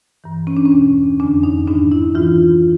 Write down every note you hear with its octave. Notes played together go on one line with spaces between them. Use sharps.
G2 E3
C#4
D4
C#4
E2 B2
F2 D3 D4
D#4
G#2 D#3 D4
E4
G#2 E3 F4